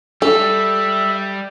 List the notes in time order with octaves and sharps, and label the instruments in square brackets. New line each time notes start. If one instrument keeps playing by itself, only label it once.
[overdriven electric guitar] G3 [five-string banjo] A4 [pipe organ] E5